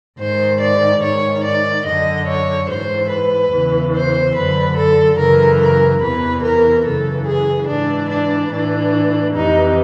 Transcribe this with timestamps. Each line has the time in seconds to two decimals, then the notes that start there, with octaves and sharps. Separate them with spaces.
0.19 G#2 D#3 C5
0.61 D5
1.02 G#2 D#3 C#5
1.44 D5
1.85 F#2 D3 D#5
2.28 C#5
2.69 G#2 E3 C5
3.10 B4
3.52 E2 C#3 E3
3.94 C5
4.36 F#2 D3 B4
4.77 A4
5.19 F#2 C#3 E3 A#4
5.60 A#4
6.02 E2 C3 E3 B4
6.44 A#4
6.86 F#2 C#3 E3 A4
7.28 G#4
7.68 G#2 E3 D4
8.10 D4
8.52 A2 E3 D4
9.35 F2 C3 E3 D#4